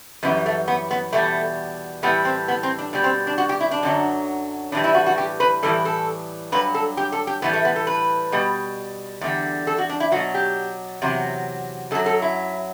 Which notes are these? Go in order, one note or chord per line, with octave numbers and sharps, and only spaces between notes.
F#2 E3 G3 B3
A3
B3
B3
E2 B2 G3 A3
A2 E3 G3 B3
C4
B3
C4
D4
B2 G3
C4
D4
F#4
G4
E4
D4
F#2 D3 F#3
A2 E3 G3 D4
E4
F#4
F#4
G4
B4
A2 E3 G3 A4
A4
G2 F#3 B4
A4
G4
A4
G4
A2 E3 G3 B3
A3
B3
A4
B4
B2 G3
E2 D3 G3
A4
F#4
D4
E4
B2 F#3 F#4
G4
E2 C3 F#3
F#2 F#3 A4
A4
E4